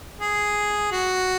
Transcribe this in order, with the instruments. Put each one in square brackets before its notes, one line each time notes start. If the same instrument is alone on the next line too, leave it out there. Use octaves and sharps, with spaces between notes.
[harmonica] G#4
F#4